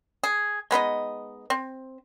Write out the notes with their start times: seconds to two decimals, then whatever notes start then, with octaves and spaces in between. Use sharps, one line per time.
0.23 G#4
0.71 G#3 B3 D#4 D#5
1.50 C4